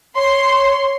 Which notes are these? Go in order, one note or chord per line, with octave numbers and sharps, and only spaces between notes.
C#5 C6